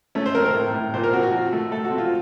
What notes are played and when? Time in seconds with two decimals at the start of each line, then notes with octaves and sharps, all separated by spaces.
0.15 A3 C#4
0.26 C5
0.35 C4 A#4
0.45 A#4
0.54 A2
0.74 A2
0.94 A#2 C5
1.03 A#4
1.13 C4 F#4
1.23 F#4
1.32 F3
1.52 A3
1.72 A3 A4
1.85 F#4
1.91 C4
1.98 F4